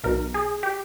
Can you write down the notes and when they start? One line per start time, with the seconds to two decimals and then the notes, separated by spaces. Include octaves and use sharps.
0.04 B1 B2 A#4
0.34 G#4
0.63 G4